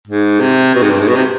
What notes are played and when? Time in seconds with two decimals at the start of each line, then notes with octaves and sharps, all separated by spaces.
0.07 G#2
0.40 C3
0.74 B2
0.82 G#2
0.90 G2
0.99 G#2
1.08 B2
1.15 C3